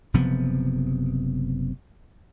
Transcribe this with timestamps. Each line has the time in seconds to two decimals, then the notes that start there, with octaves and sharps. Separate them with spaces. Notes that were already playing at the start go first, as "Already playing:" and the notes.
0.14 F#1 C3 F3 B3